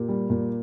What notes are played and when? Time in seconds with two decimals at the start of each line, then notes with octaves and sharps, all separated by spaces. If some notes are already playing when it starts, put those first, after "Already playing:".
Already playing: A#2 G4
0.09 G3
0.30 A#2